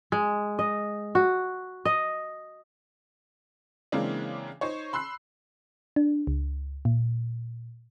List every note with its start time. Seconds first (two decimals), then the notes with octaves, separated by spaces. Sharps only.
0.12 G#3
0.59 D#5
1.15 F#4
1.85 D#5
3.92 C#3 E3 G#3 A#3 C4 D4
4.61 D#4 C5 C#5
4.93 B5 C6 E6 F#6 C7
5.96 D4
6.27 C#2
6.85 A#2